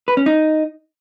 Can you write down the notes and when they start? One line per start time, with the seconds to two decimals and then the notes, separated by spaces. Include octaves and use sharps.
0.08 B4
0.17 C#4
0.26 D#4